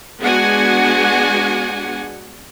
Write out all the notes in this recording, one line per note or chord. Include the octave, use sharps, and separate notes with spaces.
G#3 B3 D4 F#4 F#5 G#5